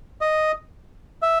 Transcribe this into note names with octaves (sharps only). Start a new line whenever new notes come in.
D#5
E5